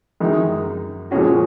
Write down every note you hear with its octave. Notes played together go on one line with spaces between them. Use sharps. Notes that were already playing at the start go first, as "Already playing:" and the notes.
F#2 D#3 G#3 D#4
A#2 F3 G#3 C#4 F#4